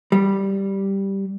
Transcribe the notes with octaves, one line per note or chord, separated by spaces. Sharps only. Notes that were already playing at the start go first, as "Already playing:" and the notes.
G3